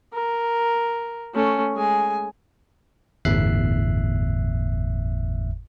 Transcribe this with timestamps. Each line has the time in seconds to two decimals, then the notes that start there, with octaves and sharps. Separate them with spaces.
0.13 A#4
1.34 A3 C#4
1.75 G#3 G#5
3.25 G1 E2 A2 E5 F#6 C7